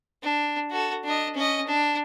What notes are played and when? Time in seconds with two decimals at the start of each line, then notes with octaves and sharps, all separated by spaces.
0.23 D4
0.71 F#4 A4
1.05 D4 D#5
1.35 C#4 D#5
1.67 D4